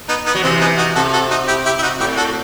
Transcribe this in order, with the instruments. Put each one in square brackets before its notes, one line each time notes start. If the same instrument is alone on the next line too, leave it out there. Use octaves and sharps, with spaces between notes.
[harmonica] B3 D#4
B3 D#4
[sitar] F#3
[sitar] C3 E3 [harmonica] C4
[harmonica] B3 D#4
D#4 F#4
[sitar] C3 [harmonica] F#4 A4
[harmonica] F#4 A4
D#4 F#4
E4 G4
E4 G4
E4
D#4 F#4
[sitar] A2 [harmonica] E4 G4
[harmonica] F#4 A4